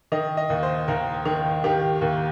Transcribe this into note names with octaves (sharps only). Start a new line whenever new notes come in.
D#3 D#5
D#5
D#2
C5
D#2 A#4
D#3
D#3 G4
D#2